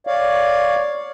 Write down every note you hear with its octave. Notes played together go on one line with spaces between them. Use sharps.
C#5 D5 F5